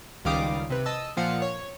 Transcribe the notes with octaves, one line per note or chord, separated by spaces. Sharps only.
C#2 D#3 G3 F5 D6 D#6
C3 B4
D#5 A5 E6
A#2 F3 F5 F#5 C#7
C#5